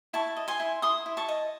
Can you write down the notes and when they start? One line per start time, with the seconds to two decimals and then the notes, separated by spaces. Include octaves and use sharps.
0.13 E4 A5 C#6
0.36 D#5
0.48 G#5 C6
0.60 E4
0.82 E4 C6 D#6
1.06 E4
1.17 A5 C#6
1.29 D#5